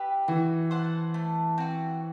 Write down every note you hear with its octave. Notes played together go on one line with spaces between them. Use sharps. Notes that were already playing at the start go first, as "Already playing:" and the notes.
Already playing: E4 G4 B4
E3 F#4
C5 F#5 A5
A3
C4 F#4